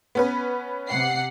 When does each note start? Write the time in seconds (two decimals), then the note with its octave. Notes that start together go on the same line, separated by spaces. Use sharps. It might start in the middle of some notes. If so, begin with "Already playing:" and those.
0.15 B3 C#4 B4
0.88 C3 F#5 C7